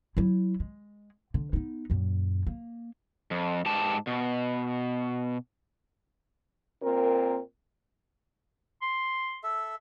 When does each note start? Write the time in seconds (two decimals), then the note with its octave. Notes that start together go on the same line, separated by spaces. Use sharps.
0.17 F#3 E4
0.60 G#3
1.34 D3
1.53 B3 D#4
1.90 F#2 A#2
2.47 A#3
3.31 F2
3.66 G#2 G4 A5
4.07 B2
6.83 A#2 C4 A#4
8.82 C6
9.43 A4 E5